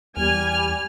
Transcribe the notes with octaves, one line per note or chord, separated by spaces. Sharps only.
E2 G3 G#5 F6